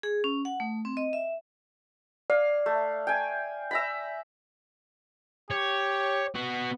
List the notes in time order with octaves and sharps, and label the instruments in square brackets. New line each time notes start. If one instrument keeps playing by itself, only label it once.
[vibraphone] G#4
C#4
F#5
A3
C4
D#5
E5
[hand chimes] D5 [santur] F5
[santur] A3
G5 G#5
E5 A#5 B5
[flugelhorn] G4 [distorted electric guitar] C#5
[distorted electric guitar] B3 F#4